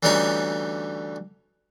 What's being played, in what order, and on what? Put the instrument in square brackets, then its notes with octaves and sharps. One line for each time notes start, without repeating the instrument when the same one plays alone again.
[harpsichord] D2 E3 G3 C#4 D#4 C6